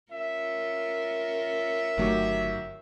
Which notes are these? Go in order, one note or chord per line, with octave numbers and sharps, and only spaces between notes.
C#4 F4 A#4 E5
G1 D#3 F#3 A3 G4